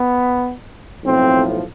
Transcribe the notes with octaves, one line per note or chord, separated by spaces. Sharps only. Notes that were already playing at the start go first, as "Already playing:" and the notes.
Already playing: B3
B1 A2 F3 C4